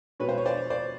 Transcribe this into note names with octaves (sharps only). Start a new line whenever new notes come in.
B2 G#3 C4 B4 C#5
C5
C#5
C5 D5
C5 D5